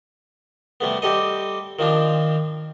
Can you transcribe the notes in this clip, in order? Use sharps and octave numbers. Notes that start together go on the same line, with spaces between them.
C3 G3 A3 B3
G3 C4 G4 A4 D#5
D#3 F3 C4 D4